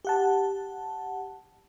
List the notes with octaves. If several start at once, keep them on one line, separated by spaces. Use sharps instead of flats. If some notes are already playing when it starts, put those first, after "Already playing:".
G4 F#5 A5